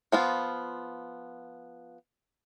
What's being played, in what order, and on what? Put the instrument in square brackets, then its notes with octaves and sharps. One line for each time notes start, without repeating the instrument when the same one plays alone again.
[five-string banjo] F3 B3 F4